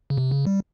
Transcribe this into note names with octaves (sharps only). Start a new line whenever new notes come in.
C#3
C3
C#3
G3